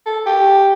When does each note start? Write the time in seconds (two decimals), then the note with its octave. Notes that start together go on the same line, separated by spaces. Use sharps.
0.06 A4
0.26 G4